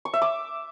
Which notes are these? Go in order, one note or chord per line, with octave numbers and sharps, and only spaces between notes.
C#6
E5
D6